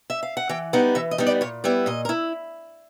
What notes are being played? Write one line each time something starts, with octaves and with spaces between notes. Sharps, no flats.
E5
F5
F#5
E3 G5
G3 B3 D#4 F#5
E3 E5
D#5
G3 B3 D#4
D5
A#2 C#5
G3 B3 E4 D5
A#2 D#5
A#4
E4